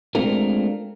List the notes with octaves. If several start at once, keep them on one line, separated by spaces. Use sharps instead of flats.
G#3 A3 C4 D4 F4 A#4